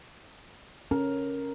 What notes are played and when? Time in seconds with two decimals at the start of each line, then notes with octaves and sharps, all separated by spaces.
0.91 C#4 A#4